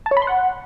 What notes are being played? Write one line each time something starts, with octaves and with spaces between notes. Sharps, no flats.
A5
C#5
B5
C6
F#5